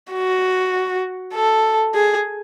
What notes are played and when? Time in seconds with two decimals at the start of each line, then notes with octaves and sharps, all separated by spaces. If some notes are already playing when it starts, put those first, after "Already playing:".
0.13 F#4
1.34 A4
1.95 G#4